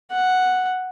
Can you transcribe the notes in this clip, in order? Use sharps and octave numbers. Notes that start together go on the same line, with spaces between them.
F#5